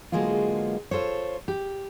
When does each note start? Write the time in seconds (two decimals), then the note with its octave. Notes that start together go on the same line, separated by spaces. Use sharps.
0.12 D3 F#3 G#3 A#3 B3 F4
0.91 F4 A4 C5 C#5
1.48 G4